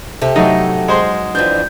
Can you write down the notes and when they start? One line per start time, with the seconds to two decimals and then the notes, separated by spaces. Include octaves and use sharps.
0.21 C3 G4 A4
0.36 F#3 A3 D#4 D#5
0.88 G#3 C5 C6
1.35 F2 E3 D4 G6